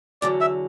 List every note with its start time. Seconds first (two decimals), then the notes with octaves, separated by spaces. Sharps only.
0.22 E2 D3 F#3 D5
0.41 E5